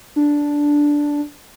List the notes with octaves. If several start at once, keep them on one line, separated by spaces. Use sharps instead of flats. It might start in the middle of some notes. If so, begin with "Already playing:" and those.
D4